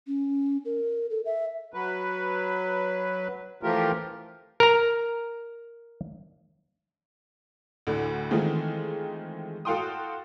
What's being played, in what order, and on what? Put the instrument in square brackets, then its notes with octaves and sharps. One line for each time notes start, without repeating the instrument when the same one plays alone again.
[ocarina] C#4
A#4
A4
E5
[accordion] F#3 B4
E3 F3 A3 F4 G4 A#4
[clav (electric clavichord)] A#4 A#5
[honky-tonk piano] D2 A2 D3
D#3 E3 G#3 A3 C4 F4
F#4 A4 F5 G5 C6 D#6